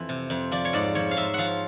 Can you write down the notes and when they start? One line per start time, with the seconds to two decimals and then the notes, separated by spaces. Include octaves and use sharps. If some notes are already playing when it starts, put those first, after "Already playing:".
Already playing: F2 E3
0.09 C3
0.30 F2
0.52 F3 D5
0.65 C#5
0.73 G#2 D5
0.95 F3 C#5
1.11 F5
1.17 G#2 E5
1.34 F3 F5 F#5